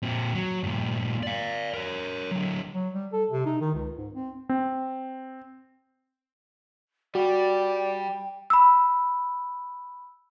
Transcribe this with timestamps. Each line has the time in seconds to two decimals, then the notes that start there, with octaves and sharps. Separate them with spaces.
0.03 A#2 C4
0.35 F#3
0.64 G2 A#2
1.23 D5 F5
1.74 A#4 C#5
2.31 D3 F#3
2.74 F#3
2.93 G3
3.13 A4
3.31 C3
3.46 D#4
3.61 D#3
3.74 C#2
3.98 G#2
4.13 C4
4.49 C4
7.15 G3 F#4 D5 G5
8.50 B5 E6